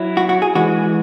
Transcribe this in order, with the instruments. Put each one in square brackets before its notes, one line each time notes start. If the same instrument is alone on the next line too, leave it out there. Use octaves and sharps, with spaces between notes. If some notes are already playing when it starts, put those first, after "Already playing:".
Already playing: [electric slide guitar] F#3 E4
[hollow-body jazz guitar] F#4
F#4
G#4
[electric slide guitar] E3 G#3 [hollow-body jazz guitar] F#4